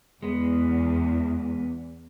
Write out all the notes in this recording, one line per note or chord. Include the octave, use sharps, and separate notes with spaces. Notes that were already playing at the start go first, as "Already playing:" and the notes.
E2 G#3 B3